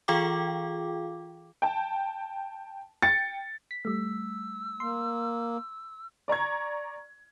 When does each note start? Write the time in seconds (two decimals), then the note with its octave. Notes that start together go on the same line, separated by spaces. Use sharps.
0.08 E3 F4 G#4 F5 G5 D6
1.62 G5 A5
3.02 G5 A6 C#7
3.71 B6
3.85 G3 A3 E6
4.80 A#3 C6
6.28 D5 A#5 C#6 G#6